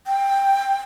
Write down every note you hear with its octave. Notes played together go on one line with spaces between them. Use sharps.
G5